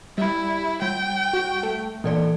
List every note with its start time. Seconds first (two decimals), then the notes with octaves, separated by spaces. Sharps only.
0.18 G3 E4
0.82 G3 G5 G6
1.33 F#4
1.63 A3
2.04 A#2 E3 A4 D5